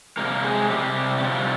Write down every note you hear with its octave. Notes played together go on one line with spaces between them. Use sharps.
C3 G3 A#3 C4 A#4
G#3 G#4
C3 G3 C4 G4
G4
C3 G3 C4 F4